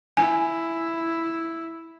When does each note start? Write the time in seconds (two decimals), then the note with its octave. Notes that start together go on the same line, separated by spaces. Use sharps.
0.17 E4 G#5